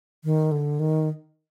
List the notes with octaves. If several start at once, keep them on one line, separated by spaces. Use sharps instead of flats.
D#3
D3
D#3